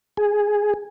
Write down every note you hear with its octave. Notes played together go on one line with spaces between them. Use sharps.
G#4